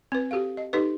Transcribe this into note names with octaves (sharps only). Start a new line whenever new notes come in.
C4 B4
F#4 G4 A4 F5
D#5
D#4 G4 A4 B4 D#5